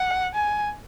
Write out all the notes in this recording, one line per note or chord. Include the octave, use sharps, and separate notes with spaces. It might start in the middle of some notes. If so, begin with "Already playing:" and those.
Already playing: F#5
G#5